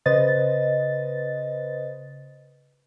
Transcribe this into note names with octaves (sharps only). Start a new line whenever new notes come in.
C#3 B4 C5 D#5 A6